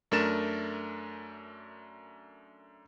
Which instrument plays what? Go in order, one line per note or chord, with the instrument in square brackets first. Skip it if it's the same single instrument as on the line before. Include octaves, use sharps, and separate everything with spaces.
[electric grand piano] F#2 A3 D4 A#4 A6 E7